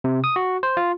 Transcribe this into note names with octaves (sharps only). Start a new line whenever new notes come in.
C3
D#6
F#4
C5
F4